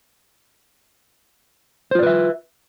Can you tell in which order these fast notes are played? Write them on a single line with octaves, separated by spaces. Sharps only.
C5 F4 D5 B4 E5